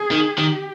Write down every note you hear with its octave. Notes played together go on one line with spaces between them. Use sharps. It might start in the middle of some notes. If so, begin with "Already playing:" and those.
Already playing: G#4
D#3
D#3 G4